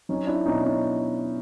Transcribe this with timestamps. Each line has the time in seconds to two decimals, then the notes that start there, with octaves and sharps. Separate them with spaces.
0.09 F#3 C#4 D#4
0.27 D4 E4
0.46 B2 C#4 D#4
0.63 C#4 D#4